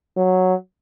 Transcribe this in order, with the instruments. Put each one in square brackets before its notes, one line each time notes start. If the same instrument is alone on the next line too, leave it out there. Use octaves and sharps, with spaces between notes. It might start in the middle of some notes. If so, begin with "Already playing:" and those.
[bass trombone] F#3